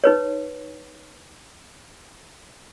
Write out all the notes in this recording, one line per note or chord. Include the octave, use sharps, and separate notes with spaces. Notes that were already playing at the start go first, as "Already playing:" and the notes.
D#4 B4 C#5